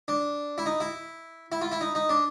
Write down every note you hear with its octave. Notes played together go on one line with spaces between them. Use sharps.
D4
E4
D#4
E4
E4
F4
E4
D#4
D#4
D4